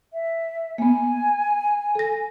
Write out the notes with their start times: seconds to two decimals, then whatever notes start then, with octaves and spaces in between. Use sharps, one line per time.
0.13 E5
0.78 A#3 B3 G#5
1.95 A4 A#6